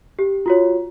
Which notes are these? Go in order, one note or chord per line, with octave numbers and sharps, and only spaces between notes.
G4
F4 F#4 C#5